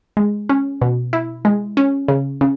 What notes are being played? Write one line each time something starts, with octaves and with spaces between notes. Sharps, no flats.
G#3
C#4
B2
E4
G#3
C#4
C#3
C#3